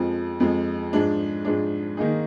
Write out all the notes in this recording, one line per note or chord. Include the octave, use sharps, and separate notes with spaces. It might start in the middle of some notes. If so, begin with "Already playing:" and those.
Already playing: F2 F3 G#3
F2 F3 G#3
G#2 F3 G#3 D4
G#2 F3 G#3 D4
D#3 A#3 D#4 G#4